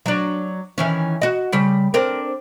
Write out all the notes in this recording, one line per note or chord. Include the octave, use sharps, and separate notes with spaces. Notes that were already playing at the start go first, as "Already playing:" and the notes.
F#3 D4
D#3 E3 C#4
F#4 D#5
C#3 G3
C4 D4 A#4